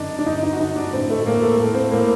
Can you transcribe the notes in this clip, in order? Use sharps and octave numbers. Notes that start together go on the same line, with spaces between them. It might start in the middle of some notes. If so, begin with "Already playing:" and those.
Already playing: F#2 D3 D4 D#4
D4
G2 D#4
D#4
F#4
D3 D#4
D4
A2 C4
A3
A3
A2 A#3
A3
A2 A3
C4
A2 A#3